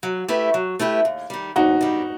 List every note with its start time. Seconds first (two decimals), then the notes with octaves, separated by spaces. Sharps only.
0.03 F#3
0.28 A3 E4 G4 B4
0.54 F#3
0.79 A3 E4 G4 B4
1.05 D#2
1.30 D#3 G3
1.56 D#2 D#4 F#4
1.81 D#3 G3